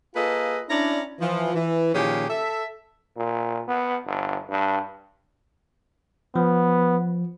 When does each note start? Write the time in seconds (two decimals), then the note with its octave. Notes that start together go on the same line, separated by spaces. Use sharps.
0.15 A#3 F4 G#4 A4 B4 D#5
0.70 C#4 D4 E4 D5 A#5
1.20 E3 F3
1.55 E3
1.94 A#2 D#3 F3 C#4 G4 G#4
2.29 A4 E5
3.17 A#2
3.68 B3
4.06 G1
4.50 G2
6.36 F3 B3